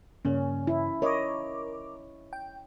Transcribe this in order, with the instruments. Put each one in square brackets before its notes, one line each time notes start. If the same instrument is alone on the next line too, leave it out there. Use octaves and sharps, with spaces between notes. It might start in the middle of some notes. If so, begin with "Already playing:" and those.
[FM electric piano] G2 C#3 A#3 [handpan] C#4
[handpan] E4
[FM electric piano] A#4 D6 [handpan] C#5 D#5
[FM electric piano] G5